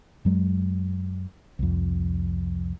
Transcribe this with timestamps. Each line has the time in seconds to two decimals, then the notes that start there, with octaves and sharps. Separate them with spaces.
0.25 F#2 F#3 G#3
1.59 C2 F2